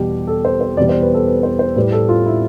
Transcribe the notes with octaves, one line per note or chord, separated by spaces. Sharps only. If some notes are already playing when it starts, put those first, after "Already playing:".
Already playing: E2 B2 G3 G4
A4
C5
C5
E2 B2 G3 D5
C5
B4
A4
B4
C5
C5
A2 G3 B4
A4
F4
E4